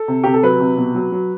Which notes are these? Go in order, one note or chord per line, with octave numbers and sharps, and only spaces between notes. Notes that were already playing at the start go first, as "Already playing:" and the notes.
Already playing: A4
C3
C3 G4
A4
F#3 B4
C3
B2
F#3
F#3